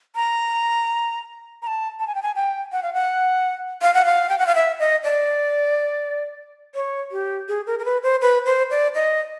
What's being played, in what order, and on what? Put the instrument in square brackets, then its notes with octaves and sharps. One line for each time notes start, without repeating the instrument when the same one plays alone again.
[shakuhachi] A#5
A#5
A5
A5
G#5
G5
G#5
G5
F#5
F5
F#5
F5
F#5
F5
G5
F#5
F5
E5
D#5
D5
C#5
G4
G#4
A#4
A#4
B4
C5
B4
C5
D5
D#5